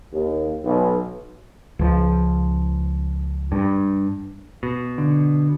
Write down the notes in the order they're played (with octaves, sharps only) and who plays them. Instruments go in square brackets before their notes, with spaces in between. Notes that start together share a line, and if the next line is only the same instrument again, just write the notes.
[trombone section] D#2
B1
[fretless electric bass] C#2 F3
G2
[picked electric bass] B2
[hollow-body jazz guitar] D3